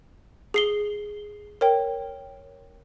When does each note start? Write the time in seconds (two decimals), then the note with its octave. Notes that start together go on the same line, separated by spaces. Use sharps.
0.54 G#4 C7 G7
1.61 A#4 C#5 G5